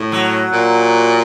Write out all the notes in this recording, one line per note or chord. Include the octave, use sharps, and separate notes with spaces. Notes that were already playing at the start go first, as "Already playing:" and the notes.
Already playing: A2
F#3
A#2